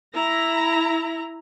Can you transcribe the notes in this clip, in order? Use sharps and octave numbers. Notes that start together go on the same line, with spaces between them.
E4 A#5